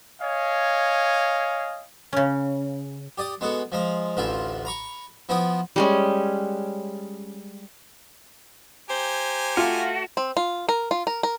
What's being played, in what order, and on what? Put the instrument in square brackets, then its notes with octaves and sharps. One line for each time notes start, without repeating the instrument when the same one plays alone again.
[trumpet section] C#5 D#5 F5 G#5
[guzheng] C#3 C#4
[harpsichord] G4 D5 D#6
G#3 B3 F#4 A4
F3 G#3 A#5
A1 D2 E3 F4 E5
A#5 B5 C#6
F3 B3 E4 G5 D#6
[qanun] G3 G#3 C#4
[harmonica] G4 G#5 A#5 [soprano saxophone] C5
[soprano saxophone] A3 [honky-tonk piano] F4 [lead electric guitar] F#4
[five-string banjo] C4
F4
A#4
F4
A#4
A#4